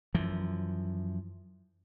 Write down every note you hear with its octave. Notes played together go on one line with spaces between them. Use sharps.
F#2 E3 F3